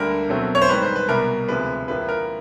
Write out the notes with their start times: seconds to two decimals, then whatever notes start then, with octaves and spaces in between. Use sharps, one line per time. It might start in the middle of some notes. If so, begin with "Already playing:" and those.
Already playing: D2 D3 G3 A#3 A#4
0.29 B2 F#3 A3 C4
0.55 C#5
0.62 C5
0.69 G#2 D#3 G3 B4
0.82 C5
0.96 B4
1.09 C2 B2 G3 A#4
1.48 D2 C3 F3 G#3 B4
1.88 A2 F3 A#3 B4
2.09 A#4